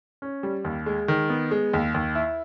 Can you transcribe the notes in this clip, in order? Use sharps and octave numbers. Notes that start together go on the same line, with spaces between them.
C#4
G3
D#2
G#3
D#3
B3
G#3
D#2
D#2
E4